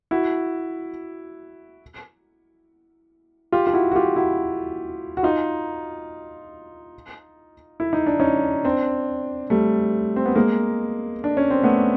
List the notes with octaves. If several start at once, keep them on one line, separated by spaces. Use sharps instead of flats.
E4 F#4
F4 G4
F4
E4 F#4
F#4
F4 G4
E4 F#4
F#4
D#4 F4
E4
D#4
D4
C#4 D#4
C4 D4
G3 A3
C4
B3
G#3 A#3
D4
C#4
C4
A3 B3